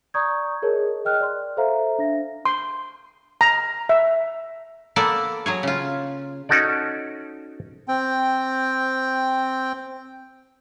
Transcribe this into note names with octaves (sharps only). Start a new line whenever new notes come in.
D5 A#5 C#6 D#6 G6 G#6
G#4 A#4 C#5 D#5 A5
D#5 G5 F6 F#6
D5 C6
A4 C5 E5 F5 A#5
D4 E5 A#6
C6
A#5
E5
A#3 B3 A4 D5
F#3 G#4 C#5
C#3 F4
C#4 D#4 F#4 A4 D5
C4 G5